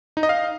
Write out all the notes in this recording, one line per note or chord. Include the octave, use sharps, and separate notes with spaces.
D#4
D#5
F5